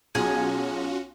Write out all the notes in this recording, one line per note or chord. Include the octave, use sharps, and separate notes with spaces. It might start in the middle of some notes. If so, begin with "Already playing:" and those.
B1 C#4 F4 F#4 G#4